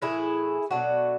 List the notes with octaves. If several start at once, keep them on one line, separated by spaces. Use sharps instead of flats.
A2 E3 A3 E4 G#4
B2 F#3 A3 D4 F#4